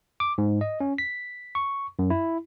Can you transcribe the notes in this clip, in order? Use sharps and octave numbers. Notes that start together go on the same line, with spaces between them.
D6
G#2
D#5
C#4
B6
C#6
F#2
E4